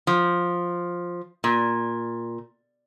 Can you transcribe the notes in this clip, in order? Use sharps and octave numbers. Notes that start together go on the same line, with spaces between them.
F3
A#2